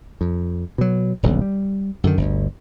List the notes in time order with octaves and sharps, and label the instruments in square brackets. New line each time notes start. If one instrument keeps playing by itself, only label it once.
[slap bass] F2
B2 F#3
D#1 B1 G2 D3
G3
F#2 D3 D#3
G1 D2